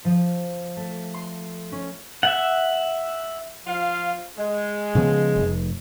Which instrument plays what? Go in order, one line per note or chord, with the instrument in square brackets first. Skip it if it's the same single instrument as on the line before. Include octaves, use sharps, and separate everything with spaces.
[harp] F3
A3
C6
C#4
[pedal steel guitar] E5 F#5
[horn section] F3 F4 F5
G#3
[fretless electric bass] C#3 F3 B3
F1